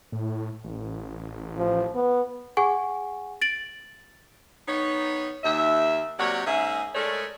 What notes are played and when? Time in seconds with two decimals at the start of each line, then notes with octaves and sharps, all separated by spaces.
0.12 A2
0.64 A1
1.58 F3
1.95 B3
2.57 G#4 F#5 G#5 C#6
3.42 A6 D7 F#7
4.67 D#3 B3 D#4 C#5
5.43 D#2 E5
6.18 C3 F#3 A#3 C#5 D5 F#5
6.47 G#2 A#3 C#4 G#4 E5
6.95 G#3 A3 A4 A#4 C#5 D5